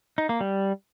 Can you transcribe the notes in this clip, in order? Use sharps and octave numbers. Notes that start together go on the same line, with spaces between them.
D#4
A#3
G3